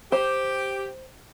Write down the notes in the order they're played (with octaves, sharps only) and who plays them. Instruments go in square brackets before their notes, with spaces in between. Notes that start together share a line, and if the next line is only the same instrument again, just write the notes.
[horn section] G4 [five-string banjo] C5